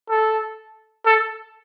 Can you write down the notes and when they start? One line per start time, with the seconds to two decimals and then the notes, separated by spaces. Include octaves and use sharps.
0.10 A4
1.06 A4